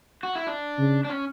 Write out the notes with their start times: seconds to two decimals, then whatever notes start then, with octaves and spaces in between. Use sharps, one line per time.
0.23 F#4
0.35 E4
0.47 D4
0.78 C#3
1.05 D4
1.10 C#4